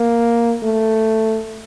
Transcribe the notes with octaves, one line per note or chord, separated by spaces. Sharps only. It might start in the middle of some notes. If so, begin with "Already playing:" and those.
Already playing: A#3
A3